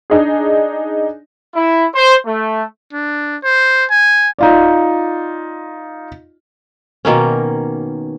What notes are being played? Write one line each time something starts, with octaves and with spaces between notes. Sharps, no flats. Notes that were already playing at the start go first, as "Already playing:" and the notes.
D4 D#4 G#4
E4
C5
A3
D4
C5
G#5
D#4 F4 D5
B2 D#3 A#3 C#4